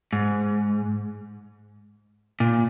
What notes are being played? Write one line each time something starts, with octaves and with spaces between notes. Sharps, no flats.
G#2
A#2